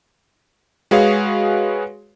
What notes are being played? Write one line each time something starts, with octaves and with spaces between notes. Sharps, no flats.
G#3 F#4 G#4 B4 C#5 F5